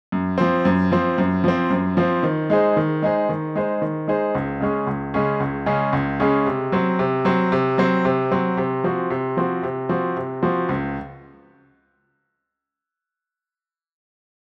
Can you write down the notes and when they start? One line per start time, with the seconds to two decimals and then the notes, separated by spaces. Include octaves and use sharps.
0.12 F#2
0.38 F3 C4
0.65 F#2
0.92 F3 C4
1.18 F#2
1.44 F3 C4
1.70 F#2
1.97 F3 C4
2.23 D#3
2.50 G#3 D#4 G#4 C5
2.77 D#3
3.02 G#3 D#4 G#4 C5
3.29 D#3
3.56 G#3 D#4 G#4 C5
3.82 D#3
4.08 G#3 D#4 G#4 C5
4.35 C#2
4.60 C#3 G#3 C#4 G#4
4.87 C#2
5.14 C#3 G#3 C#4 G#4
5.40 C#2
5.66 C#3 G#3 C#4 G#4
5.93 C#2
6.20 C#3 G#3 C#4 G#4
6.46 C3
6.72 F#3 C4
6.99 C3
7.25 F#3 C4
7.52 C3
7.78 F#3 C4
8.05 C3
8.31 F#3 C4
8.57 C3
8.84 F3 C4 F#4
9.10 C3
9.37 F3 C4 F#4
9.63 C3
9.89 F3 C4 F#4
10.17 C3
10.43 F3 C4 F#4
10.69 C#2